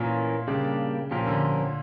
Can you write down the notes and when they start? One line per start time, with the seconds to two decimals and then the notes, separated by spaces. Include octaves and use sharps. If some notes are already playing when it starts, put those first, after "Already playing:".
Already playing: A#2 E3 A#3 C#4 F4 A#4
0.48 C#3 G3 A#3 D4 G4 D5
1.11 A#2 F3 C#4 G4 A#4
1.27 D3